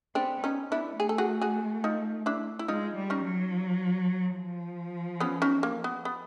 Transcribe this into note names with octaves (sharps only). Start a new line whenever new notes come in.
B3 C4 D4
C#4 D#4
B3 D4 E4
A3 G#4
A4
F#4 G#4
F#4 G#4
D#4 F4
D4 E4
E4
G#3 D#4 F4
G3
C#4 D#4
F#3
F3
B3 C#4
C#4 D#4
A#3
B3
B3